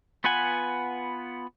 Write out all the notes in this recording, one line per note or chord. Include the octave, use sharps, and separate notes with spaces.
B3 F4 B4 F#5 G#5